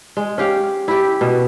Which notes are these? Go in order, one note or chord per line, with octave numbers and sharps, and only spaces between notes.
G#3
C#4 G4 F5
E4 G4
B2